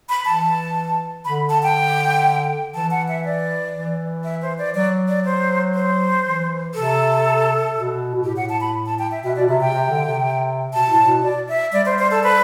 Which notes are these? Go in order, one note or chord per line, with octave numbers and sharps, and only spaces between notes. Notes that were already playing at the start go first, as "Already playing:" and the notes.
B5
E3 A5
D3 B5
A5
G5
E3 A5
F#5
E5
D5
E3
E5
C5
D5
F#3 D5
D5
C5
C5
E3
C3 A4
B2
B2
A2 G4
F#5
A5
B5
A5
G5
E5
B2 E5
D5
B2
C3 E5
G5
C3
D3
C3
B2 A5
A2
B2
D5
E5
G3 D5
C5
C5
A4
B4